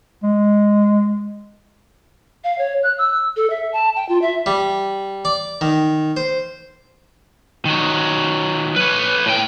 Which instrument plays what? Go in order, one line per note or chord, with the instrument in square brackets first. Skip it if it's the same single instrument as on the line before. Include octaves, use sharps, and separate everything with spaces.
[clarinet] G#3
[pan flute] F5
C#5
F#6
E6
A4
E5
A5
G5
F4
E5
[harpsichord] G3
D5
D#3
C5
[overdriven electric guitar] D#3 F#3
B4 C#5
A2 G5